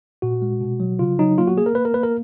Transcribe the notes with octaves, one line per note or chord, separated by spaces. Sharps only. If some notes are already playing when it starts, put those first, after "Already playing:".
A#2 F#4
G#3
B2
F#3
C#3 F4
F#3 D#4
A#3 F4
F#4
A#3 G#4
A#4
A#3 B4
A#4
A#3 B4
A#4